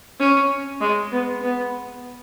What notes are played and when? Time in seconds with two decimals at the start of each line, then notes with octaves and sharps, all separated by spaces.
0.20 C#4
0.81 G#3
1.12 B3
1.42 B3